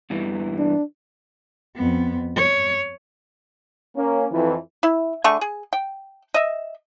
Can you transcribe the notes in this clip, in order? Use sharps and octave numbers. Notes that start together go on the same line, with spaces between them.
E2 G2 E3
D4
F2 B3
C#5
A#3 C#4
F2 E3
E4
D3 A3 G#4 C#6
G#4
G5
D#5 E5